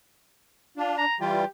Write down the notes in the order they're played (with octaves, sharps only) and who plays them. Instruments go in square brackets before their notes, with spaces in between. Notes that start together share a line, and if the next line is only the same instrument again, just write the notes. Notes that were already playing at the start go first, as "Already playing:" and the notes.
[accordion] D4 [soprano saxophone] F4
[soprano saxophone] A#5
[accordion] E3 G3 F4 [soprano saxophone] G4